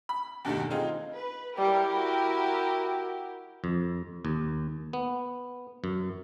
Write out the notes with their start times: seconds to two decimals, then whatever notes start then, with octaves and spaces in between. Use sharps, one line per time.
0.09 B5
0.45 E2 G2 B2 D#3 G3 A3
0.70 C4 D#4 F4 G#4
1.13 B4
1.57 G3 E4 G4 A#4
1.94 F#4
3.64 F2
4.25 D#2
4.93 B3
5.84 F#2